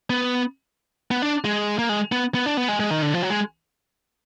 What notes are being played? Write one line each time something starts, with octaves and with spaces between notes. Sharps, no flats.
B3
B3
D4
G#3
A#3
G#3
B3
B3
D4
B3
G#3
G#3
D#3
D3
F3
F#3
G#3